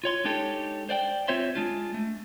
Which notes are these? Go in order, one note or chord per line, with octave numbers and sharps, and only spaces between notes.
F4 C#5 C6
G#3 D4 D#4 G4 A4 C#5
C5 D5 F#5 G5
C4 F4 C5 C#5 E5 C6
G#3 D4 F4
A3